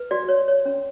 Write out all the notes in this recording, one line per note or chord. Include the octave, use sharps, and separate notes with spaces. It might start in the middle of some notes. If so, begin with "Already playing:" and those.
Already playing: B4
F#4 D5
C#5
C#5
C#4